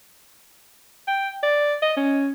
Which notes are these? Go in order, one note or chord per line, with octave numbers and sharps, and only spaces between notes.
G5
D5
D#5
C#4